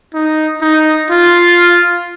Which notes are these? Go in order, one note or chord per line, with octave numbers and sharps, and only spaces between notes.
D#4
D#4
F4